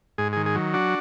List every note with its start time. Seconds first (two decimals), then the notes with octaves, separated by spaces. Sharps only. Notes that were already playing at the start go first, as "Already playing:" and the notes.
0.18 G#2 G#4
0.33 D#3 G#4
0.46 G#4
0.55 F#3
0.74 D4 F#4